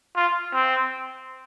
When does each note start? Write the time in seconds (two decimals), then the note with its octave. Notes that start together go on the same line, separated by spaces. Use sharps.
0.16 F4
0.54 C4